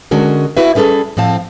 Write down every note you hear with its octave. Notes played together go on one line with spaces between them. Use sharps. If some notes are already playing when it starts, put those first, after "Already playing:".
D3 G#3 C#4 F#4 A#4
E4 F#4 B4 E5
G3 C#4 G#4 A4 B4
A2 F3 C4 F5 A5